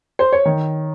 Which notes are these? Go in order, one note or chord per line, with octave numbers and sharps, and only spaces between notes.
C5
C#5
D#3